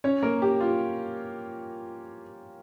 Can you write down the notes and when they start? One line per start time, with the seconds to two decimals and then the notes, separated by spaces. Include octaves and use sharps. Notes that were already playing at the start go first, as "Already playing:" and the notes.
0.04 C#4 C#5
0.22 A#3 A#4
0.42 G4
0.60 F4